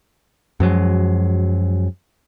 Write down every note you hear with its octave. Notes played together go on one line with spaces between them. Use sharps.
F#2 F3 F#3 G#3